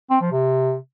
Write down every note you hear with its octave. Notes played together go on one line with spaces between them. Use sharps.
C4
F3
C3